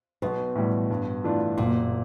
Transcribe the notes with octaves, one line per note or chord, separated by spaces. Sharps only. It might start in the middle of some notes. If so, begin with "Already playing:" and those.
B1 B2
A2 E3 G3
G2
E3 A3 D4 F4
F#1 A#2